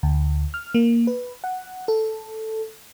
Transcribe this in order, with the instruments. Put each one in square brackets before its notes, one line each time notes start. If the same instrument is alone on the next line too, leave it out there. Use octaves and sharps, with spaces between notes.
[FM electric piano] D2
F6
A#3
B4
F#5
A4